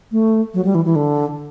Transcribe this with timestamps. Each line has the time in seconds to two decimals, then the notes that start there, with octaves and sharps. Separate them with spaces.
0.12 A3
0.54 F#3
0.65 G3
0.75 E3
0.85 E3
0.96 D3